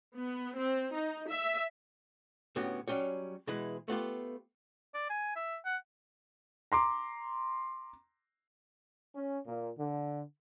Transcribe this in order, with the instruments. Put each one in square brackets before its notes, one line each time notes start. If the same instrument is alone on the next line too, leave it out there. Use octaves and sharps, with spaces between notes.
[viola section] B3
C4
D#4
E5
[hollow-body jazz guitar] A2 D3 B3 C#4 F#4 G4
F#3 G3 C#4 G4 C#5
B2 E3 G#3 E4
A3 B3 F4 G4
[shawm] D5
G#5
E5
F#5
[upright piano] A#5 C6 D6
[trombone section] C#4
A#2
D3